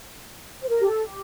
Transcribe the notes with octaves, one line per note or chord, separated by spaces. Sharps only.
C5
A#4
G4
A4
G4